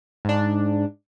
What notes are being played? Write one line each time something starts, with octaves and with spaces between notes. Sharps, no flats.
G#2 D4